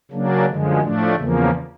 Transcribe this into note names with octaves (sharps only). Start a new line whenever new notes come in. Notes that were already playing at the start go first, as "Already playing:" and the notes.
C#3 F#3 A#3 D4
F#2 D3 F3 G#3
A2 F3 A3 D4
E2 C#3 F3 A#3